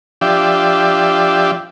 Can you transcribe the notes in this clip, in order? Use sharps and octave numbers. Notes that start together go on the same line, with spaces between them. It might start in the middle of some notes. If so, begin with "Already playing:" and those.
F3 D4 G4 E5